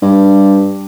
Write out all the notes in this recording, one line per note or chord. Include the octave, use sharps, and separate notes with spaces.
G2